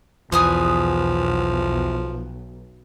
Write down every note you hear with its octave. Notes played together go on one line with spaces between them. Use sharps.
B1 E2 F3 B4 G#5 D#6